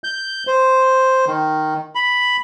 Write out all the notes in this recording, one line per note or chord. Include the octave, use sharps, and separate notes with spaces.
G6
C5
D#3
B5